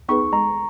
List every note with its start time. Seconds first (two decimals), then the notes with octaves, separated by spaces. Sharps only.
0.09 B3 D#4 G#4 B4 C#6
0.32 G#3 A#5